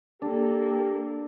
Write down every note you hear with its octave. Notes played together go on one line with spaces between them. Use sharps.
A#3 D4 G4 A4